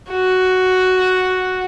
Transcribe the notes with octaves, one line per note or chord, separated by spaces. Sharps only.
F#4